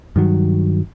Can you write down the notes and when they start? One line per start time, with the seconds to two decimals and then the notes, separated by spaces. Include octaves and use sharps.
0.16 G2 D#3 F#3